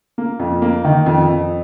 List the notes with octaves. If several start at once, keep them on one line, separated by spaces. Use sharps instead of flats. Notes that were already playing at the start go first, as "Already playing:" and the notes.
A#3
F2
A#3
D#3
F2
F2